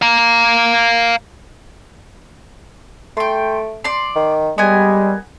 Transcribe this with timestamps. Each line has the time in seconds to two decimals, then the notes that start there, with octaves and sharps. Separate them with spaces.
0.02 F5 A#5
3.17 A3 G5 C6
3.84 D5 C6
4.16 D#3
4.58 G3 G#3 B3 A#4 G#5